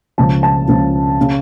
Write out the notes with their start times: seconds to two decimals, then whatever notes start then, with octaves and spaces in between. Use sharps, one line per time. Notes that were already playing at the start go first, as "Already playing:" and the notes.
0.18 C#2 C#3 F3 A5
0.43 A5
0.67 C#2 C#3 F3
1.21 C#3